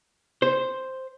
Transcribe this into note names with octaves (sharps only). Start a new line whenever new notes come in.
C5